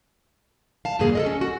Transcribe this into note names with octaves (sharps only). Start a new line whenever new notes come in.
F5 A5
E2 G2 A#2 D3 A#3 G#4
A4 A#4 D#5
C#4
F#4